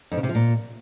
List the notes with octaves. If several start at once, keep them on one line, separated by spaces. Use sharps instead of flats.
F2
C#3
C3
F3
A#2